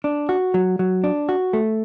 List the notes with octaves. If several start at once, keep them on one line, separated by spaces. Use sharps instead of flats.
D4
F#4
F#3
F#3
D4
F#4
A3